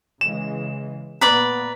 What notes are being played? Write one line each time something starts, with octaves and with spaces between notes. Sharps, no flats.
C#3 E3 G#3 E7
A#2 B3 B4 D5 A#5 B5